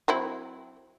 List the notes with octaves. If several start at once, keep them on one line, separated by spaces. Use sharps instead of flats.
F#3 C4 E4